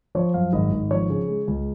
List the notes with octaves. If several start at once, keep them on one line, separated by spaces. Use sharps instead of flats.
F3 C#5
F#2 F5
G#1 D#5
G#1
F3 C#5
C#3
G#3
C#2